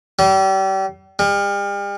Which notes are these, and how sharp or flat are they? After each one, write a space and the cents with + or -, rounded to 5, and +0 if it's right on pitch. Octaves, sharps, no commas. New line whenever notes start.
G3 -35
G3 +40